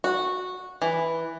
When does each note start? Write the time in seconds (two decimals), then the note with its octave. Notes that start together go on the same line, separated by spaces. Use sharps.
0.04 F#4
0.82 E3